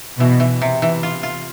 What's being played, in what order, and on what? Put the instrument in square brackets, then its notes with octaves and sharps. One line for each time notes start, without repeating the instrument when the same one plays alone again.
[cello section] B2 [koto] E3
[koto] E3
C3
E3
F4
F4